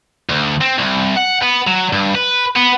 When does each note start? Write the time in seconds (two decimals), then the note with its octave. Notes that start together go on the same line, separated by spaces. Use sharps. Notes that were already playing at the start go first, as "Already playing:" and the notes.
0.29 D2
0.61 C4
0.78 C2
1.16 F#5
1.43 B3
1.67 F#3
1.93 G2
2.15 B4
2.56 B3